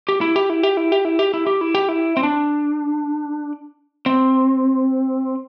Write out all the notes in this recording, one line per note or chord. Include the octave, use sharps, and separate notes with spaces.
G4
E4
G4
E4
G4
E4
G4
E4
G4
E4
G4
E4
G4
E4
C4
D4
C4